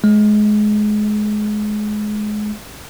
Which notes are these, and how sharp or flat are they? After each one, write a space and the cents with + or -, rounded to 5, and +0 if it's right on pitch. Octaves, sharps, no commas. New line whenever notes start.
G#3 +25